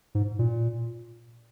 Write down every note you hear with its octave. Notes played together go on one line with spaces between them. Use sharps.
G#2
A#2